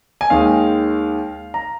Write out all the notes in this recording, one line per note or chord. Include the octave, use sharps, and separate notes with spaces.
G#5
D#2 D#3 G#3 F5
A#5